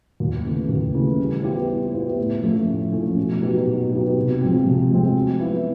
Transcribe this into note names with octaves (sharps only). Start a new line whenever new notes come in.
D#2
C#3 E3 A3
D#2
C#3 E3 A3
G3
B3 E4 G4 C5
G3
B3 E4 G4 C5
A2
F3 A3 C#4 E4
A2
F3 A3 C#4 E4
B2
F#3 B3 D#4 G4
B2
F#3 B3 D#4 G4
C3
F3 G#3 C4
C3
F3 G#3 C4
F#3
B3 E4